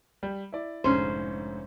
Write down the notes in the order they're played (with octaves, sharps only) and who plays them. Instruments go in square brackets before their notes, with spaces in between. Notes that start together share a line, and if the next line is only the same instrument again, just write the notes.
[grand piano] G3
E4 D5
[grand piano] F1 G#2 D3 [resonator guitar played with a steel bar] C#4 C5